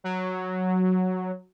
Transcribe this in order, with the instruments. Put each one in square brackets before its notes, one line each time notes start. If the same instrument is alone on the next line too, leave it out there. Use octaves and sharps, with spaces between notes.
[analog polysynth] F#3